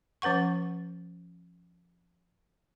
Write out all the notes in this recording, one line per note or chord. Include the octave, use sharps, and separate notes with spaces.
F3 C#4 B4 F#5 C#6